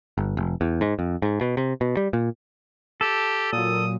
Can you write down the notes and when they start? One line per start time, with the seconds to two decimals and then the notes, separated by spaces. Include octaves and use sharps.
0.18 G1
0.37 F1
0.61 E2
0.81 G#2
0.99 F2
1.22 G#2
1.41 B2
1.57 C3
1.81 B2
1.97 G3
2.13 A#2
3.01 G4 A4
3.52 A#2 F#3 D#6